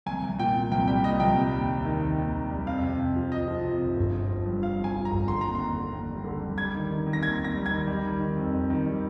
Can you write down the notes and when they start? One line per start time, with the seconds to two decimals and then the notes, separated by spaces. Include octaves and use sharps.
0.06 C2 G#5
0.22 C2
0.38 A#2 G5
0.55 A#2
0.71 C2 G5
0.87 G3 G5
1.04 A#2 D#5
1.20 C2 G5
1.36 G3
1.52 D#2
1.69 D#2
1.85 D#3
2.01 D#3
2.18 D#2
2.35 D#2
2.51 G3
2.66 F2 F5
2.83 C3
2.99 F2
3.16 F3
3.32 F2 D#5
3.48 F3
3.64 C3
3.81 F1
3.97 G1
4.14 F3
4.29 F3
4.45 G2
4.62 F3 F5
4.79 F3 G#5
4.95 F3
5.05 A#5
5.11 G1
5.27 D3 C6
5.41 D#2 A#5
5.55 D#2 C6
5.76 D3
5.93 D#2
6.09 G3
6.25 D3
6.41 G3
6.58 G3 G#6
6.75 D#3
6.91 D#3
7.07 D#3
7.13 A#6
7.23 D#2 G#6
7.39 D#2
7.44 A#6
7.55 G3
7.66 G#6
7.71 D#3
7.87 G3
8.04 D#3
8.20 D#3
8.36 F2
8.53 F2
8.70 D#3
8.86 G3